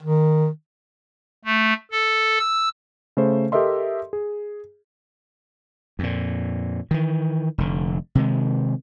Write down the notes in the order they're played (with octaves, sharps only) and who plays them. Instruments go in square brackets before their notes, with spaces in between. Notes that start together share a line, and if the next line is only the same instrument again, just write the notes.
[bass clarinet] D#3
[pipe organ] A3
A4
E6
[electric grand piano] C#3 A3 C5
G4 A4 A#4 D#5 E5 C6
G#4
[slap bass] F2 A#2
D#3 E3
F1 D3
C3 D#3 G#3